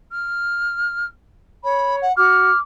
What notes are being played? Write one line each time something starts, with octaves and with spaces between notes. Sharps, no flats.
F6
C#5 B5
F#5
F#4 D6 F6